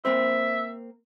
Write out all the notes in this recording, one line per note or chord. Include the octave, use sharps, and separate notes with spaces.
A#3 C4 C5 E5